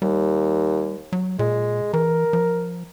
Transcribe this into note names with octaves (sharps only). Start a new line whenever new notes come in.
D#2 G3
F#3
A#2 G#3
E3 A#4
F3